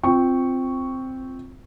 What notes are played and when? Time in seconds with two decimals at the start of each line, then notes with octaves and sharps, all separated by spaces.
0.04 C4 F4 G5 C#6